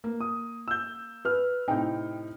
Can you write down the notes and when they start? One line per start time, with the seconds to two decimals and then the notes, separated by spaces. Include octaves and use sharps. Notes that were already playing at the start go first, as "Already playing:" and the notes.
0.04 A#3
0.21 D#6
0.68 E6 G6
1.25 B4 F6
1.68 A2 C3 D#4 G5